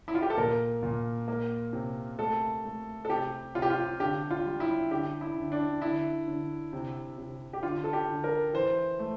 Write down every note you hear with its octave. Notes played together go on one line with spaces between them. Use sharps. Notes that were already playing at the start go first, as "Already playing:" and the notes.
E4
F4
G4
A4
A#2 A#4
A#2
A#3
C3
A3 A4
A3
A4
C3 G4
C3 F4
G4
F4
D3 G4
F4
G3
E4
D3 G4
E4
D3
D4
D3 E4
D3
C3
C3
G4
D3 F4
A4
G4
D3
A#4
E3 C5
A3